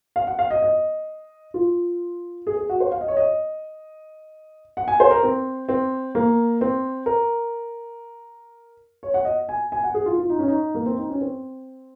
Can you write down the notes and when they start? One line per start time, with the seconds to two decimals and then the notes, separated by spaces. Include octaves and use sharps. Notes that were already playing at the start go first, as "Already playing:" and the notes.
0.16 F5
0.27 F#5
0.39 F5
0.51 D#5
0.62 D#5
1.54 F4
2.47 G#4
2.57 G#4
2.69 F#4
2.80 C5
2.92 F5
3.01 D#5
3.08 C#5
3.17 D#5
4.77 F#5
4.88 G#5
5.00 C5
5.11 A#4
5.23 C4
5.69 C4
6.15 A#3
6.61 C4
7.06 A#4
9.03 C#5
9.14 F#5
9.25 D#5
9.49 G#5
9.72 G#5
9.84 F#5
9.94 G#4
10.06 F4
10.18 F4
10.30 D#4
10.39 C#4
10.48 D#4
10.75 A#3
10.86 C4
10.98 D#4
11.10 C#4
11.21 C4